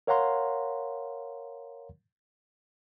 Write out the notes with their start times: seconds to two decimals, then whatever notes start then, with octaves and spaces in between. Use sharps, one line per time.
0.07 A#4 C#5 F5 F#5 A#5 C6